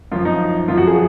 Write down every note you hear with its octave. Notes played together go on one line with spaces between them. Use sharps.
F#2 F3 F4
D#4
F#2 F3 F4
F#4
G#4